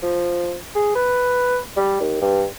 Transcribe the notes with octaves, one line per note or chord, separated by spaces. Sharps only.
F3
G#4
B4
G3
D#2
G2